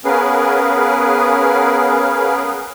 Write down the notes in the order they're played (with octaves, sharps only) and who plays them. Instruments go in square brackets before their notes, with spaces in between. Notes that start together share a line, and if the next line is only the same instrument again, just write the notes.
[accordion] B3 C#4 G#4 A#4 B4 F5